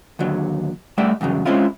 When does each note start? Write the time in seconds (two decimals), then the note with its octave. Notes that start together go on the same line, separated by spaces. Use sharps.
0.19 D#2 D3 F#3
0.98 G3 A3 D5 E5 F#5
1.21 E2 G2 C#3 F#3
1.45 G#3 C4 C#4 E4 F4